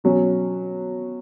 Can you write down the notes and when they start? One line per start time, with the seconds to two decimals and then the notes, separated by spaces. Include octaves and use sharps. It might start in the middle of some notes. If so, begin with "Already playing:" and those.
0.04 B2 F#3 C#4